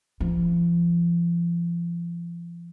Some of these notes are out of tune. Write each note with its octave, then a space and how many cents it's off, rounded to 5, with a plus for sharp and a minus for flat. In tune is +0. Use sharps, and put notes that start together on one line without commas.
F3 -35